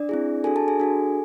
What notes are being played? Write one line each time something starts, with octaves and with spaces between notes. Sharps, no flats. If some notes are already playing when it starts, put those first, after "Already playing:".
Already playing: D4 D5
C4 E4 G#4
D4 F#4 G#4 A4 G#5
A4 A5
G#4 G#5
D4 F#4 A4